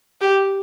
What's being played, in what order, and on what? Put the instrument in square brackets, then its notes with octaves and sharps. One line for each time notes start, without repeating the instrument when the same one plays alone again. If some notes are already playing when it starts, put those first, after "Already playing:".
[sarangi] G4